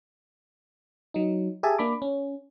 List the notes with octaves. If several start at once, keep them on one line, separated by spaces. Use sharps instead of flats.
F#3 D#4
G4 G#4 E5 G#5 A5
A#3 D4 B5 D6
C#4